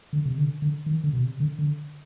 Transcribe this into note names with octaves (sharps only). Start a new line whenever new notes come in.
D3
C3
D3
D3
D#3
D3
B2
C3
D3
D3